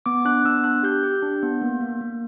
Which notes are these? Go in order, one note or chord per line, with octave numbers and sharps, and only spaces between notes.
B3 D6
D4 F#6
B3 E6
D4 F#6
G4 G6
G4
D4
B3
A#3
A#3
A#3